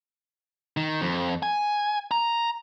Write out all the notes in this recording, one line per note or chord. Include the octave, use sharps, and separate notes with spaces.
D#3
F2
G#5
A#5